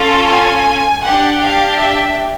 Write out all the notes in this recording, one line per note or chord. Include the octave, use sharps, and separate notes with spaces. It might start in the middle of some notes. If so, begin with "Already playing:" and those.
Already playing: C#4 F4 A4
G#5
D4 G4 F#5
F5
E5